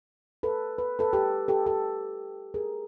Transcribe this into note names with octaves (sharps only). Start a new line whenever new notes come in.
A4 B4
B4
A4 B4
G4 A4
G4 A4
G4 A4
G#4 A#4